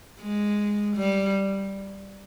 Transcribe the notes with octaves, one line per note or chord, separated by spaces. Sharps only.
G#3
G3